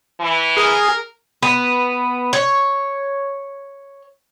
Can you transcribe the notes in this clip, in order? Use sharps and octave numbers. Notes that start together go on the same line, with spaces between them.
E3
G#4 A#4
B3
C#5